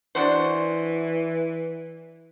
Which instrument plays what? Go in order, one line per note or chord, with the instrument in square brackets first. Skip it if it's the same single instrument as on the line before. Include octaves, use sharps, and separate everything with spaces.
[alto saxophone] E3 [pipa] D4 F#4 C5